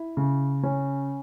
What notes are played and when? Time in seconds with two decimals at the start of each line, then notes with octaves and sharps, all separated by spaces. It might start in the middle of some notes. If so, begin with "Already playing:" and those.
Already playing: E4
0.17 C#3
0.63 C#4